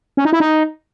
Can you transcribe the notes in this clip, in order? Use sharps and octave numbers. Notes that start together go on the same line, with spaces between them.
C#4
D#4
E4
D#4